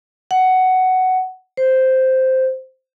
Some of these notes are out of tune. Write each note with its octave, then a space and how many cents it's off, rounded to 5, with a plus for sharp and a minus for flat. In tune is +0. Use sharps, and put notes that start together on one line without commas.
F#5 +10
C5 -5